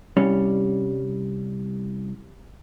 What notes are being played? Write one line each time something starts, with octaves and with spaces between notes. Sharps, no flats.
C2 G3 C#4